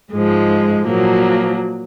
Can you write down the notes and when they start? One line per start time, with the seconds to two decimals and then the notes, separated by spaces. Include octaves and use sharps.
0.12 G#2 F3 G#3
0.86 A#2 F3 F#3 A#3